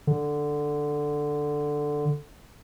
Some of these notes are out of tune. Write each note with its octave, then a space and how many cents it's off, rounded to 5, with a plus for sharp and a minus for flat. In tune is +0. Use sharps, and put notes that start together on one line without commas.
D3 +5